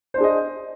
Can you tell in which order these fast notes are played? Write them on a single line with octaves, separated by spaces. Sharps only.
C5 D4 G#4 D#5